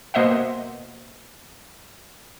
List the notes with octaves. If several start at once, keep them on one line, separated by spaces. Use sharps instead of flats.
B2 A#3 C5 D#5 E5 F#5